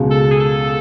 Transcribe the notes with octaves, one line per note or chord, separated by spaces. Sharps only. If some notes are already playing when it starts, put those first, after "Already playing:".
Already playing: C#2 B2 G#3
A4
G#4
A4